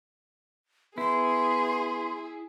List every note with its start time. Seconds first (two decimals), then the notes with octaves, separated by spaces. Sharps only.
0.98 B3 E4 G#4 C6